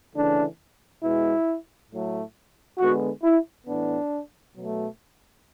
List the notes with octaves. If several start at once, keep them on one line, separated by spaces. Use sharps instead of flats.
C#3 E3 A3 D4
B2 G#3 B3 E4
A2 F#3 A3
D3 G#3 B3 F#4
E4
A2 E3 B3 D4
B2 F#3 A3